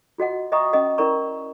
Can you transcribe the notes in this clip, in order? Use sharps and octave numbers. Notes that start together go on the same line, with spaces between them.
F4 F#4 D#5 F#5
D#5 E5 G5 A#5 C#6 D#6
C#4 D#5 F#5
C#4 E4 A#4 D5 A#5 C#6